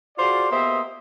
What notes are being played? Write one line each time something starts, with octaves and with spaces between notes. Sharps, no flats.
F4 F#4 G#4 C5 D5
A#3 B3 G4 C5 D#5 E5